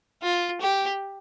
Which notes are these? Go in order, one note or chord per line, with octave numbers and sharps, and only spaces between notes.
F4
G4